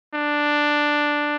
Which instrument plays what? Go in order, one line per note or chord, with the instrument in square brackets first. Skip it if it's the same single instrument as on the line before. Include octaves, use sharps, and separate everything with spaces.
[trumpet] D4